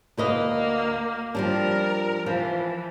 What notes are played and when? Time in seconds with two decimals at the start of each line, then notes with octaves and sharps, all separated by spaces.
0.17 D2 A#3 B4 D#5
1.35 F3 G3 D4 A#4 A#5
2.26 E3 F3